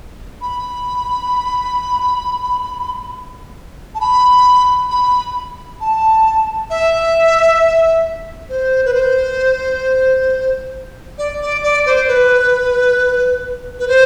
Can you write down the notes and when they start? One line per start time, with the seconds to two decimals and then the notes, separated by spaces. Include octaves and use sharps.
0.41 B5
3.94 A5
4.00 B5
4.90 B5
5.80 A5
6.70 E5
8.49 C5
8.85 B4
8.94 C5
11.18 D5
11.41 D5
11.63 D5
11.86 C5
12.08 B4
13.79 B4
13.87 C5